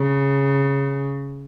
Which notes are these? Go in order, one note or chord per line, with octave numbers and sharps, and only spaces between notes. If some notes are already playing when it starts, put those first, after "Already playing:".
Already playing: C#3